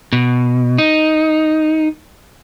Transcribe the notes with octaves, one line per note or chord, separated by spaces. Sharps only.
B2
D#4